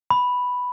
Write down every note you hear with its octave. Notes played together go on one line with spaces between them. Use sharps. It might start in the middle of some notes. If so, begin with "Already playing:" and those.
B5